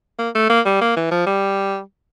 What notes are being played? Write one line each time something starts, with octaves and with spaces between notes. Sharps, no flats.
A#3
A3
A#3
G3
A#3
E3
F3
G3